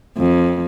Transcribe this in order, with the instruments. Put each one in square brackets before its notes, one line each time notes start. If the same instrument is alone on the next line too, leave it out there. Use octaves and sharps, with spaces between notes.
[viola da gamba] F2